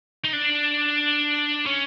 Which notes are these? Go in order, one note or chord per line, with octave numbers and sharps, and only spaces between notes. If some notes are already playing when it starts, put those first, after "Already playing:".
D#4
D4
C#4